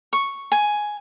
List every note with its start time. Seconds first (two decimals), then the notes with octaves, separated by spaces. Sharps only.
0.13 C#6
0.52 G#5